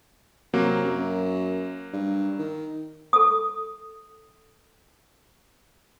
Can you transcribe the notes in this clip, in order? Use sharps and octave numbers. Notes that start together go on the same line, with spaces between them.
C3 F#3 A#3
F#2
G2
D#3
A4 D#6